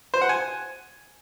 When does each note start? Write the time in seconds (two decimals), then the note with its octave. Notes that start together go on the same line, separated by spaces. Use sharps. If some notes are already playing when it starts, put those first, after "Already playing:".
0.14 C5
0.21 F#5
0.29 G#5